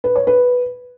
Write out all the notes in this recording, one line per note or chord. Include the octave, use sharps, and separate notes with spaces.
B4
C#5
B4